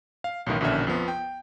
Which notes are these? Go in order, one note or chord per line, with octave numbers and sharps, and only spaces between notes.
F5
B1 F#2 A2 D#3 E3
A#1 B2 D3 D#3 C#4 E5
F2 F3 B3
G5